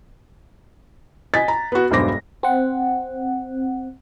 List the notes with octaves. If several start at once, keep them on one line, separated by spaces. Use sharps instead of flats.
D#5 G#5 A6 B6
A#5
B3 F#4
E1 B1 G2 C5 D6 A#6
C4 F#5